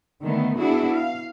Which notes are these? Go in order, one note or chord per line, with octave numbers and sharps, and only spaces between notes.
D3 D#3 A3 B3
B3 D4 E4 F#4 G#4
F5